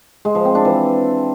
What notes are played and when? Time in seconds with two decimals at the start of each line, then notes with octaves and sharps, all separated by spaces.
0.25 G#3
0.35 F3
0.45 C4
0.55 D4
0.65 E3